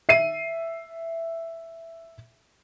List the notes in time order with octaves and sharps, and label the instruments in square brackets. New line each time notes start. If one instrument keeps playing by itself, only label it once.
[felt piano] E5 C7 D#7